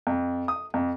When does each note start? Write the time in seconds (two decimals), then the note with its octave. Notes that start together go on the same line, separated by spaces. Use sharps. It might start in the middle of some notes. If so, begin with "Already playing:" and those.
0.07 F2
0.48 D#6
0.74 F2